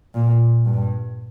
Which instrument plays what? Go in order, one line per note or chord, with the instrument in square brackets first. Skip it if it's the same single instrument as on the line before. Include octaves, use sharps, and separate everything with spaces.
[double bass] A#2
G2